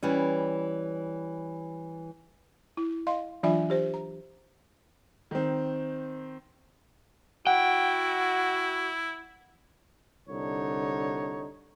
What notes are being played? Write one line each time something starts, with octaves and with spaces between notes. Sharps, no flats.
E3 G3 C#4
E4
D#5 F5 C6
E3 F#3 D4 F4 E5 G#5
G4 C5
A#5
D#3 C4
E4 F#4 F#5 G5
C2 D3 D4 D#4 C#5